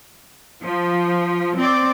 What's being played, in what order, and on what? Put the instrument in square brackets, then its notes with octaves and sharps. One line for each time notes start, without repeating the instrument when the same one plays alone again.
[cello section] F3
C4 D5